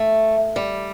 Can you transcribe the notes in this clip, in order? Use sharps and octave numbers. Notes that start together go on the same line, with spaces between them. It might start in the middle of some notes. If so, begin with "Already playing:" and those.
Already playing: A3
G3